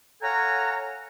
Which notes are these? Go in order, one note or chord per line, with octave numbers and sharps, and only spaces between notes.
A4 C#5 F5 F#5 G#5 A#5